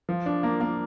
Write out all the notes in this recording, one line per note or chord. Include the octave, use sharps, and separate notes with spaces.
F3
D4
A#3
A#3